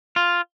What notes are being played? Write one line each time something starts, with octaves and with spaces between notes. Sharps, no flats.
F4